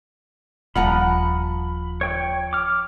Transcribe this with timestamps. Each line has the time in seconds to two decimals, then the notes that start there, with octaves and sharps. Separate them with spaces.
0.75 D#1 F3 F#5 A#5 B5
2.01 C#5 G5 C#6
2.53 D6 F6